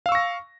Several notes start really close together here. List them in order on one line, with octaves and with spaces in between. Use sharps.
F5 E6 C#6 A#6